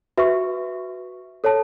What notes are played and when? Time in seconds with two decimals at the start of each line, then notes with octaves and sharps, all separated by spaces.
0.18 F#4 B4 E5 C#6
1.44 A4 C#5 A5